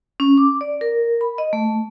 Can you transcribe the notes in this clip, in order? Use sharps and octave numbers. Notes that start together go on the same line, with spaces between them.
C#4
D6
D5
A#4
B5
D#5
A3